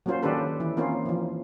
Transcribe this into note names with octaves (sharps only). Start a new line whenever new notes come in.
F#3 A#3 C#4 F4 C5
D#3 C#4 D4 G4 A4 B4
E3 E4
A#3 C4 C#4 D#4 F4
E3 F3